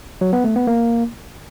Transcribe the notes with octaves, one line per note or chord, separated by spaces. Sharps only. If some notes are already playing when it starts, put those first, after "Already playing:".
F#3
B3
A3
B3
A#3